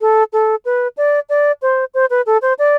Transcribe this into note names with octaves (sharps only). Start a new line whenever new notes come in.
A4
A4
B4
D5
D5
C5
C5
B4
A4
C5
D5